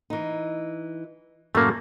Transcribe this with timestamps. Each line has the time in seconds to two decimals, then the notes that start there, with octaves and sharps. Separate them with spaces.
0.10 E3 D#4
1.55 F#2 A2 C#3 A3 A#3